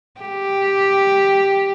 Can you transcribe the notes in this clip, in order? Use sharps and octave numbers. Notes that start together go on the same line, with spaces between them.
G4